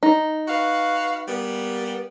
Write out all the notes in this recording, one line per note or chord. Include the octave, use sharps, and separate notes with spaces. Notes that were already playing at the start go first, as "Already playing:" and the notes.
D#4
F#4 B4 F5
G3 A#3 B3